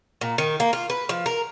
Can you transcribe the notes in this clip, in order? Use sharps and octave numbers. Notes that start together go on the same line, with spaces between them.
A#2
D#3
A#3
F4
B4
F3
A#4